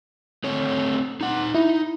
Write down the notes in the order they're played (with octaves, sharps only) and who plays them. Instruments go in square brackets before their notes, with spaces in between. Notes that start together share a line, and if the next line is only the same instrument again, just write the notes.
[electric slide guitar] A3 C4 C#5
D#4 F#5
[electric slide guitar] D#4 [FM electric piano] E4